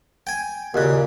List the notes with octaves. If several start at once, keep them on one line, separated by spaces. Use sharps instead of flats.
G5 G#5
D#2 A#2 C#3 F#4 D#5 F#6